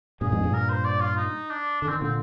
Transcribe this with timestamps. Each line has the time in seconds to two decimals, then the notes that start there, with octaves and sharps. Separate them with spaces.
0.21 G2 A#2 G#4
0.32 F2 G#2
0.43 G2 A#2
0.54 A#4
0.70 C5
0.85 D5
1.01 F4
1.17 D#4
1.50 D4
1.82 D3 D4
1.88 C4
1.91 D#3
2.01 A#2 D3 C4